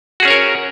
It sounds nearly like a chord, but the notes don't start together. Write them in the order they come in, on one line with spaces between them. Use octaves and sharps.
F#4 G#4 C#4 C#5 A#4